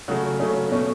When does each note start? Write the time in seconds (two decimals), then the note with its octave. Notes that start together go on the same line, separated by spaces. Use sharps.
0.08 C#3 F#3 A3 F#4
0.39 C#3 F#3 A3 C#4
0.71 B2 A3 C#4